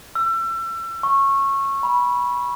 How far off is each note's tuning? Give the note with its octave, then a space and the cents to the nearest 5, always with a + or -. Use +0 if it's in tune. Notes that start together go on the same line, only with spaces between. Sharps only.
E6 +35
C#6 -15
B5 -20